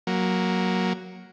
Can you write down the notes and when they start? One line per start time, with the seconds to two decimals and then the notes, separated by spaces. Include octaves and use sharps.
0.07 F#3 A#3